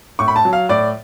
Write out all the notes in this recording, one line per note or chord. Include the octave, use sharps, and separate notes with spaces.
A2 C#6
B5
A5
F#3
F5
A2 D5